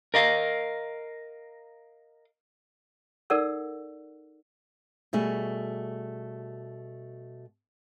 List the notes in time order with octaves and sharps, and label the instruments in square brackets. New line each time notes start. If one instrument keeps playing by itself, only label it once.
[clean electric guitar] A#4 D#5 F5
[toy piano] D#4 A4 A#4 D5 F#5 E6
[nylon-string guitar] B2 G3 A3 F#4 G#4